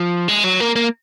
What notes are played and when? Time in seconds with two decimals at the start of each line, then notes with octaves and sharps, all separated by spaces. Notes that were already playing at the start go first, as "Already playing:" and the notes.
Already playing: F3
0.29 G#3
0.44 F#3
0.61 A#3
0.76 A#3